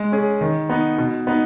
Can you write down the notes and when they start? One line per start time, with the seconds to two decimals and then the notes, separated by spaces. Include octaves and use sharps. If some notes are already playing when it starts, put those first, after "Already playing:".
Already playing: G#3
0.12 C#4 G#4
0.41 D#3
0.69 B3 D#4
0.98 B2
1.27 B3 D#4